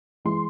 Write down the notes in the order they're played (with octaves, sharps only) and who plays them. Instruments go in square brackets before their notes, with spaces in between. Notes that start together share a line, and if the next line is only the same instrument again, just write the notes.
[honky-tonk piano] E3 G#3 C6